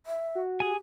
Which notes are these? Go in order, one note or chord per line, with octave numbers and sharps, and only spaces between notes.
E5
F#4
G4 G#4 G#5